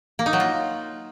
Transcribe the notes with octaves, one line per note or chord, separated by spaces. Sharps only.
A#3
D#4
F#3
F4